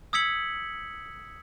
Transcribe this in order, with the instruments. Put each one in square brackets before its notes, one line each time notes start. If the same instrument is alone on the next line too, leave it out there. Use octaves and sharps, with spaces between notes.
[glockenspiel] D#6 E6 G#6 B6 C#7 F#7